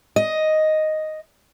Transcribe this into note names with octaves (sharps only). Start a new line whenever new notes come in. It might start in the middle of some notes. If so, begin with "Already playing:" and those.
D#5